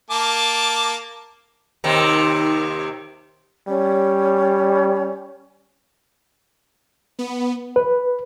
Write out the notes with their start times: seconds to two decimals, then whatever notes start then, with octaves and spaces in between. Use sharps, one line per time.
0.10 A#3 A5 D6
1.84 D#2 C3 D#3
3.68 G3 C#4
7.19 B3
7.76 B4